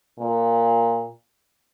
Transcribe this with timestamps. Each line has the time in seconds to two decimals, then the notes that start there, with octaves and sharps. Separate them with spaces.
0.19 A#2